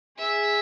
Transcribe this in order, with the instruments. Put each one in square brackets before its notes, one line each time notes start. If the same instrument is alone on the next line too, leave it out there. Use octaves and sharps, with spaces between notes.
[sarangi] G#4 [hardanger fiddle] E5